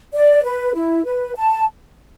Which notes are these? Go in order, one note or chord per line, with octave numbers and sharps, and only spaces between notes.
D5
B4
E4
B4
A5